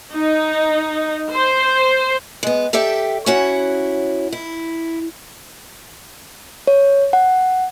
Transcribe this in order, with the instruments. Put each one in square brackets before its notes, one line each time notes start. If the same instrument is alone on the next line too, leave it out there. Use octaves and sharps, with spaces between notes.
[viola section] D#4
C5
[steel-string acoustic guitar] G#3 B3
G4 A4 D5 E5 G5
C#4 E4 F#4 C#5 F#5
E4
[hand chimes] C#5
F#5